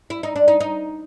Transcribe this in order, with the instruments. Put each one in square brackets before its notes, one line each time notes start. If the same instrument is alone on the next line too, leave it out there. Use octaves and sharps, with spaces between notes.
[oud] E4
D#4
D4
D#4
D#4